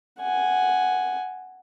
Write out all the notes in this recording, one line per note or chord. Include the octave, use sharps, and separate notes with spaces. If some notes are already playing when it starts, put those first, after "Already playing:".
F#5 G#5